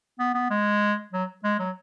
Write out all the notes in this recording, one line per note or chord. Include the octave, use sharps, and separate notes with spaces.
B3
B3
G#3
F#3
G#3
F#3